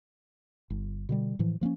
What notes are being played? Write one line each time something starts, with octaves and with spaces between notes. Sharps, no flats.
G1
B2 D3 G3
A2 E3 F3
F3 A#3 C4 C#4